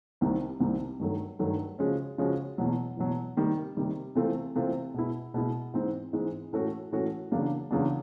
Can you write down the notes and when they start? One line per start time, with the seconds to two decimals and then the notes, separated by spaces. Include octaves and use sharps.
0.21 C2 C3 D#3 G3 C4
0.60 C2 C3 D#3 G3 C4
1.00 G2 D#3 F#3 A3
1.39 G2 D#3 F#3 A3
1.79 C#3 F3 G#3 C#4 F#4
2.18 C#3 F3 G#3 C#4 F#4
2.58 E2 B2 F#3
2.97 E2 B2 F#3
3.36 C3 D#3 G3
3.77 C3 D#3 G3
4.15 C3 E3 A3 C4 F4
4.55 C3 E3 A3 C4 F4
4.94 B2 G#3 B3 E4
5.34 B2 G#3 B3 E4
5.74 G#2 E3 G#3 C4
6.13 G#2 E3 G#3 C4
6.53 A2 E3 A3 C#4 F#4
6.92 A2 E3 A3 C#4 F#4
7.32 E2 C#3 F#3 A#3 D4
7.71 E2 C#3 F#3 A#3 D4